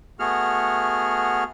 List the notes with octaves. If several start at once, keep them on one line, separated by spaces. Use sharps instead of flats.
A3 B3 F#4 G#4 F6